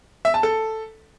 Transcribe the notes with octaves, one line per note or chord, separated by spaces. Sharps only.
E5
A5
A4